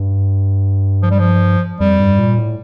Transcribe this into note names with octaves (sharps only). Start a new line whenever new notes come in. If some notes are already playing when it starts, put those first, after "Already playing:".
Already playing: G2
F3
G3
F3
F2 G3
G2
A#2
A2